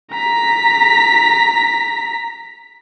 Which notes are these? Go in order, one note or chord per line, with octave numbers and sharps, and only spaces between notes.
A#5 B6